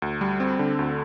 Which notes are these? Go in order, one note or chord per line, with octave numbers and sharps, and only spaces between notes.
D2
G3
C4
D3
D2